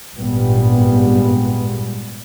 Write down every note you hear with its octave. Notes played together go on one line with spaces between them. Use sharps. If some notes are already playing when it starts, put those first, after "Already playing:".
G#1 G2 A#2 G3 G#3 B3